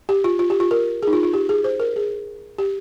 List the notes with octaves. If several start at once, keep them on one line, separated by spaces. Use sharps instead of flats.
G4
F4
F4
G4
F4
A#4
D#4 G#4
F4
F4
G4
G#4
C5
A#4
G#4
G4